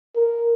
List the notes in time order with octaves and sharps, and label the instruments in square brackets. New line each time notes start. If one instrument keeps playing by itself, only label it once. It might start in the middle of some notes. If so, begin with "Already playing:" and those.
[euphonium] A#4